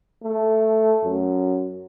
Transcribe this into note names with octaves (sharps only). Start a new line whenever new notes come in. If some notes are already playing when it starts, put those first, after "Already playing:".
A3
F#2